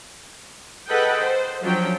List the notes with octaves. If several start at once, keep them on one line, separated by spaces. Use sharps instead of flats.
G#4 A4 B4 D#5 F#5 G5
C5
F3 F#3 C#4 D4 C5 G5